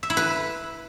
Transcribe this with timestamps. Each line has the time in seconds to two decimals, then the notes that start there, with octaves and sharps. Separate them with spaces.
0.03 E5
0.10 E4
0.17 B4